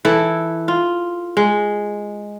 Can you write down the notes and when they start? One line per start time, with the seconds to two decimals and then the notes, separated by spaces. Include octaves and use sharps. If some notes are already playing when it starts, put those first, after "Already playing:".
0.05 E3 E4 A4
0.68 F4
1.37 G#3